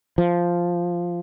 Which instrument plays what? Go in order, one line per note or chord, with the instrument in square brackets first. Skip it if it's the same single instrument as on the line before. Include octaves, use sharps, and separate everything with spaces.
[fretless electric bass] F3